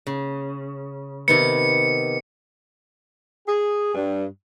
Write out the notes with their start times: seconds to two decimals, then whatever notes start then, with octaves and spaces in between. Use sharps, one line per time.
0.07 C#3
1.28 C3 D#3 B3 C#7
3.47 G#4
3.94 G2